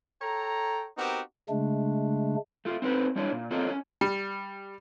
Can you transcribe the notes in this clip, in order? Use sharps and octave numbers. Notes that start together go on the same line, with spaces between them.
A4 C#5 G5 A#5
B3 C4 D#4 F#4 G4 A#4
C#3 G#3 A3 D4
A3 F4
C4 D#4 A4 B4 C5
G3 D4 E4 C#5
A#2
C4 F4 A4 A#4 C#5 D#5
C#4
G3